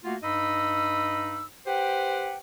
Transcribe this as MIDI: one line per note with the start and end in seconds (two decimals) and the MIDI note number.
0.04 0.16 57
0.04 0.16 58
0.04 0.16 65
0.04 0.16 66
0.04 0.16 78
0.22 1.45 43
0.22 1.45 63
0.22 1.45 75
0.22 1.45 83
0.22 1.45 88
1.66 2.37 67
1.66 2.37 71
1.66 2.37 72
1.66 2.37 78
1.66 2.37 79